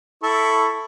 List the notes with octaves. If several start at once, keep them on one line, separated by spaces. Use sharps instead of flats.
E4 A4 C#6